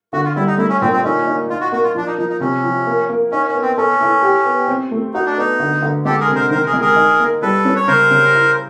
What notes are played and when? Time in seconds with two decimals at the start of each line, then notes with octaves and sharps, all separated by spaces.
0.13 D3 F#4
0.25 F4
0.36 G3 E4
0.47 D#4
0.58 A3 E4
0.69 C#4
0.81 A#2 C4
0.93 C4
1.04 C#4 D#4
1.27 D#4
1.50 D#4 F4
1.61 F#4
1.72 A#3 F#4
1.84 F4
1.95 F3 D4
2.06 D#4
2.18 F3 D#4
2.29 D#4
2.40 C3 C#4
2.63 F3
2.86 A#3
3.09 A#3
3.32 C#4 D#4
3.47 C#4
3.55 B3
3.62 C4
3.77 C#4 A4
4.01 E4
4.22 G4
4.45 B3
4.68 C4
4.91 A3
5.14 D#4 F#4
5.26 D4
5.37 B3 D#4
5.60 D3
5.82 D3
6.05 G#3 G4 A4
6.20 G#4 A#4
6.28 C3
6.36 A#4 C5
6.51 D#3 A#4 C5
6.66 G#4 A#4
6.73 G#3
6.81 G#4 A#4
6.96 D#4
7.20 A#3
7.42 G3 A4 B4
7.65 C#4
7.76 C#5
7.87 C#3 A#4 C5
8.11 C#3
8.33 E4